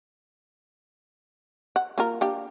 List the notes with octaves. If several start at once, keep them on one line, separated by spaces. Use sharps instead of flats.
F#5
A#3 F4 A#4
A#3 D4 G4